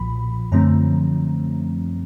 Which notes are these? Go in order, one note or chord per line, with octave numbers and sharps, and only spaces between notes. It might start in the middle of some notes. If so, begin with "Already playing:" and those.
Already playing: B1 A#2 F3 B5
F#2 D3 F3 A3 C4 A#5